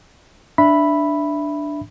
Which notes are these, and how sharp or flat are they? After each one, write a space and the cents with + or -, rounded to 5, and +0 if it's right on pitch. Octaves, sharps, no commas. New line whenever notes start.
D4 +0 E5 +5 B5 +0